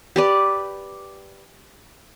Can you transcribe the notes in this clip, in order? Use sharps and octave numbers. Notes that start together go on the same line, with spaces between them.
G4 B4 D5